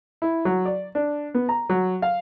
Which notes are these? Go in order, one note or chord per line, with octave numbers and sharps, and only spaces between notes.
E4
F#3
D5
D4
B3
A#5
F#3
F5